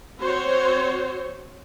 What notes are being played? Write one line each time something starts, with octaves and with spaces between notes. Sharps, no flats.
C4 F#4 C5 C#5